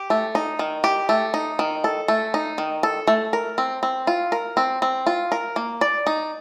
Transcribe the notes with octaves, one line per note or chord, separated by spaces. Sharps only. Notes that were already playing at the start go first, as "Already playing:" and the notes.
Already playing: G4
A3
D#4
D#3
G4
A3
D#4
D#3
A4
A3
D#4
D#3
A4
A3
A#4
C4
C4
F4
A#4
C4
C4
F4
A#4
A#3
D5
D#4